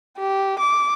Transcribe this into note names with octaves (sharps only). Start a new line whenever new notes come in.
G4
D6